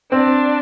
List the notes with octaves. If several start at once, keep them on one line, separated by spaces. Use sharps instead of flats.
C4 D4